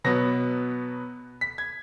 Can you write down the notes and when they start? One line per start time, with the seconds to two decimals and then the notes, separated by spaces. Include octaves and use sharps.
0.04 B2 F#3 B3 A#6
1.41 B6
1.58 G#6